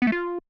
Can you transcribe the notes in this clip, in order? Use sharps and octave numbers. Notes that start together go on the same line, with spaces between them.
B3
A3
F4